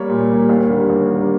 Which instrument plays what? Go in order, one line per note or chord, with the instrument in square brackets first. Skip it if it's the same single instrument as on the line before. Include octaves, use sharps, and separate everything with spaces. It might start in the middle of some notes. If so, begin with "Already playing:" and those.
Already playing: [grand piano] G3 A#3 C#5
A#2
G3 A#3
D#2
D3 G3 A#3
D#2
D3 G3 A#3